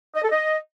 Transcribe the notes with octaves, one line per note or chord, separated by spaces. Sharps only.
D#5
A4
D#5